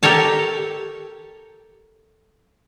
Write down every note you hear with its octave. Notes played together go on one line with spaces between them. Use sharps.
G4 A4 A#4 C#5 A5